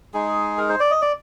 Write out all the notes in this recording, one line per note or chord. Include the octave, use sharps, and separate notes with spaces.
G#3 D#4 G#4
A#4
C5
D5
D#5
D5